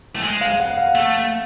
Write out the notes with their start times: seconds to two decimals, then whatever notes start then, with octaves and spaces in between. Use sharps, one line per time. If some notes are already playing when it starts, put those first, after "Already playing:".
0.15 A3
0.23 G#3
0.41 F5
0.60 F#5
0.77 F5
0.95 A3